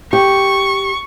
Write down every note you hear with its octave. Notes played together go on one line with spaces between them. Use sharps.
G4 C#6